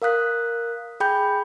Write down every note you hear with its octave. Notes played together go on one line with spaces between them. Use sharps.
A#4 F5 D#6 F#6 B6
G#4 G5 B5 G6